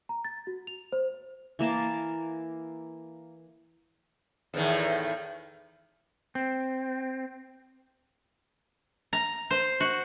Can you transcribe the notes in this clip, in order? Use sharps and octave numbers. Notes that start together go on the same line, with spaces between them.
A#5
A6
F#4
F7
C5
E3 A#3 A5
E2 A2 D#3
C4
A#5
C5
F#4